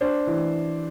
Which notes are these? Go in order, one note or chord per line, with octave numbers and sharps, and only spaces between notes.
D4 C5
E3